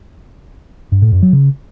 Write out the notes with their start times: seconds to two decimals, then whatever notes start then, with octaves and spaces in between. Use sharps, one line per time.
0.92 G2
1.02 A2
1.12 F#2
1.23 F#3
1.33 C#3